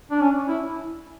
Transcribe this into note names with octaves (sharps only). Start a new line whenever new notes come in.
D4
C#4
E4